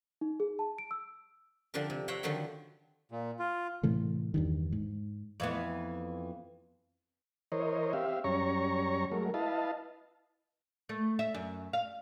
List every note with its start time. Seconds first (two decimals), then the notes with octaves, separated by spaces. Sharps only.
0.21 D#4
0.40 G#4
0.59 A5
0.78 D7
0.91 E6
1.74 D3 F3 D4 G4 A#4
1.90 C3
2.08 C5 C#5 E5 F#5 G5 A#5
2.23 D3 D#3 F3 F#3 G4
3.11 A#2
3.39 F4
3.83 A2 C3 E3 A3
4.34 E2 G2 D#3
4.72 G#2
5.40 F2 E3 B3
7.52 E3 A#4 C5 C#5 D#5
7.93 C4 G4 E5 F5
8.24 F#2 G3 C#4 C#5 A#5 C#6
9.11 F#3 G#3 A3 A#4
9.34 E4 B4 D#5 F5 A5
10.89 A3
11.19 E5
11.34 F#2
11.73 F5